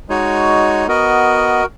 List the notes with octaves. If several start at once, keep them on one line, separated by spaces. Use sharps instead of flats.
G#3 D#4 F#4 C#5
B3 F#4 A#4 D#5